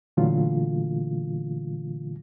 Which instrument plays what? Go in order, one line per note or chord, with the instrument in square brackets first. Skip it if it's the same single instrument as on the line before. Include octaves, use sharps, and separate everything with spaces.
[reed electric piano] A#2 D3 E3 F#3 A3 F4